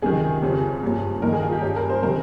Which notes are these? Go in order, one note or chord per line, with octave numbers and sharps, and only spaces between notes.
C#2 C3 D#3 G#4
F2 C#3 G3 C4
G2 F3 A#3 C#4
G2 D#3 A#3 D#4 A#4
G#4
F4
G4
G2 G3 C#4 G#4
A#4
C5
C3 D#3 A#4